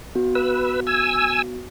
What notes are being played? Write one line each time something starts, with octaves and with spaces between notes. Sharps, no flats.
B3 F#4
B4 E6
G#5 E6